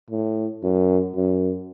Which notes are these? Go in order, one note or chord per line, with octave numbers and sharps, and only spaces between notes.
A2
F#2
F#2